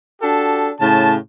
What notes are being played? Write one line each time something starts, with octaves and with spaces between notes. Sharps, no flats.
D4 F#4 G4 A4
A2 C#3 A5